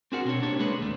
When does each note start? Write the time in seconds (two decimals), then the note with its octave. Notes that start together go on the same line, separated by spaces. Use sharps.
0.12 C4 D4 F#4 G#4 A#4 F#5
0.25 B2 C4 D4 C#5
0.42 C2 A#3 D4 G4 C#5
0.59 G#3 A#3 D4 G#4 B4
0.80 D#2 A#2 G#3 A3